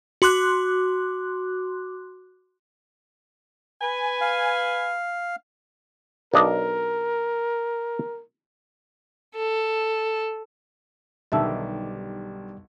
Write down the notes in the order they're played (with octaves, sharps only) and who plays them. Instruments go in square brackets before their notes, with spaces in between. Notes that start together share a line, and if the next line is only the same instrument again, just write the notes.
[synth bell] F#4 C6 D6 F#6
[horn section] B4 G#5
[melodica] F5
[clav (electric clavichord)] B1 D4 D#5 [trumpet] A#4
[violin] A4
[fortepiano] B1 D3 D#3 [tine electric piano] G3 G4 [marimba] E5 A5 E6